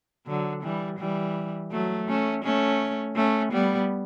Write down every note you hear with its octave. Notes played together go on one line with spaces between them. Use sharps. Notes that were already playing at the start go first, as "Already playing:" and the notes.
D3 F#3
E3 G3
E3 G3
F#3 A3
A3 C#4
A3 C#4
A3 C#4
G3 B3